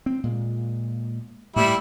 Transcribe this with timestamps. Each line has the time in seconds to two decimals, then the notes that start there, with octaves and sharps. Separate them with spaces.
0.06 C4
0.24 A#2 G#3
1.56 A2 G3 A#3 E4